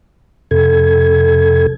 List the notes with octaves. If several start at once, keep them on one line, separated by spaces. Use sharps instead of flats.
F2 C3 A4 G#6